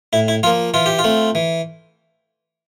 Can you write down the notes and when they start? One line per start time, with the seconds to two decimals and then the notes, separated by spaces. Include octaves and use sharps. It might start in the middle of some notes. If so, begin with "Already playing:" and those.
0.13 A2 E4
0.28 E4
0.43 F3 A#3 F4
0.74 E3 F4
0.86 G4
0.99 F4
1.04 A3 C4
1.35 E3